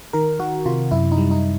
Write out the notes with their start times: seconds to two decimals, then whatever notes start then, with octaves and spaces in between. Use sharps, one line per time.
0.13 D#3 A#4
0.39 D#3 F#4
0.66 C3 F4
0.91 F#2 E4
1.12 D#4
1.18 G3
1.31 D#4